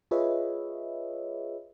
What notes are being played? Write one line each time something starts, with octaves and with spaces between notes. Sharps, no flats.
F4 G#4 B4 C#5 D#5 E5